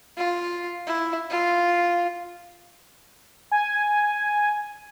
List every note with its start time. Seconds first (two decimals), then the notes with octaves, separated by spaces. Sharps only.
0.17 F4
0.87 E4
1.30 F4
3.52 G#5